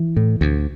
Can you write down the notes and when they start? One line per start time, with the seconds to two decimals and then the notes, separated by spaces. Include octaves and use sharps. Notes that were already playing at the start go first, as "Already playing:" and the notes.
Already playing: E3
0.17 A2
0.41 D2